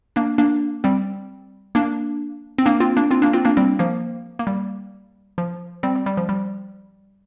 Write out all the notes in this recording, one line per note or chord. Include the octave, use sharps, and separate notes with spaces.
A#3 D4
A#3 D4
G3 C4
A#3 D4
C4
A#3 D4
C4 F4
A#3 D4
C4 F4
A#3 D4
C4 F4
A#3 D4
G3 C4
F3 A#3
A#3
G3
F3
G3 C4
G3
G3
F3
G3